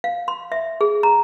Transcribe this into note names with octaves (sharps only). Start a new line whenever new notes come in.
F5
C6
E5
G#4
A#5